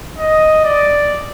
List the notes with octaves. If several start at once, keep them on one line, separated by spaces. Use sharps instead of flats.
D#5
D5